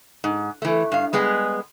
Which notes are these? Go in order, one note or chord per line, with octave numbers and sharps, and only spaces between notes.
G#2
E3 A3
G2 F5
G3 G#3 B3 G#4 D#5